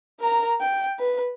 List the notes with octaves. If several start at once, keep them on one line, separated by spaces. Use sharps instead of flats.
A#4 A#5
G5
B4